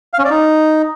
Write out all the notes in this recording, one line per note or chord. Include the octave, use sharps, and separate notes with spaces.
F5
C#4
D5
D#4